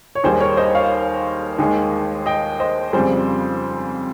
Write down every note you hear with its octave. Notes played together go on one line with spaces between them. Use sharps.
C#5
D#2 D#3 G3 G#4 C5
A#4 C#5
C5 D#5
C#5 F5
D#2 D#3 G#3
D#5 G5
C5 D#5
F2 C#3 G3 G#4 C5